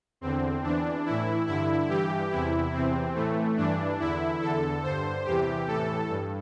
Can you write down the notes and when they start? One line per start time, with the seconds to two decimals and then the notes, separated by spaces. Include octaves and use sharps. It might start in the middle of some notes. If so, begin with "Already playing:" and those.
0.21 E2 D3 C4
0.63 E2 E3 D4
1.05 A2 E3 E4
1.47 G2 D3 E4
1.89 G2 E3 G4
2.31 E2 C3 E3 E4
2.73 E2 C3 E3 C4
3.15 A2 E3 A3
3.57 G2 E3 D4
3.99 E2 D3 E4
4.41 E2 D3 A4
4.83 G2 D3 C5
5.25 E2 C3 E3 G4
5.67 A2 E3 A4
6.09 G2